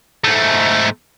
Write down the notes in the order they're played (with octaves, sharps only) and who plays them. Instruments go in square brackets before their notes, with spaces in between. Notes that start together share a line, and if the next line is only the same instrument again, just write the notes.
[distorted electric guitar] G#2 A3